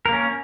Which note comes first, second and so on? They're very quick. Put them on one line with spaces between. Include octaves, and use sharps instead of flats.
A#4 A#3 C#4